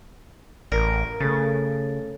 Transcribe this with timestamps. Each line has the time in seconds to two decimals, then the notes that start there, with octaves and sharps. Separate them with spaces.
0.72 A1 A#4 D5
1.20 C#3 A3 A4 A6